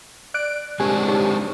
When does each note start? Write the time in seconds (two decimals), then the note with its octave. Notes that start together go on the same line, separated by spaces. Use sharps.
0.34 D5 F#6 D7
0.80 G#3 C4 D4 G4 G#5 C#6
1.08 D#4 G4 C#5 C#6